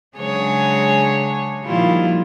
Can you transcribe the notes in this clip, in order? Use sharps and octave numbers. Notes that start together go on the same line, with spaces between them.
C#3 F#3 G#3 D4 G#4 C#5
A#2 D#3 F3 G3 E4 F4